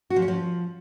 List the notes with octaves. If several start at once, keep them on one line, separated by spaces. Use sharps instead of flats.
F#4
F3
C#4
F3